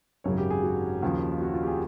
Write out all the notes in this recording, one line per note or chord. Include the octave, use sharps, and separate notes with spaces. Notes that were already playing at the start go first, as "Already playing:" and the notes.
G#1 F#2 C#3 F#3 C#5
G4
G#4
F#4
D#2 C#3 F3
F#4
F4
G4
G#4